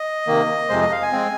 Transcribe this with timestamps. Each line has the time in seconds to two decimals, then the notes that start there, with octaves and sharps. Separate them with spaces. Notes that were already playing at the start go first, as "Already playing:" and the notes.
Already playing: D#5
0.27 C3 D#3 A#3
0.69 F2 C3 G#3 C5
0.81 D#5
0.92 F5
1.03 G#5
1.12 G#3 C4